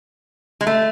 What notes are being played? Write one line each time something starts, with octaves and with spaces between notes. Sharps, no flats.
G#3
A3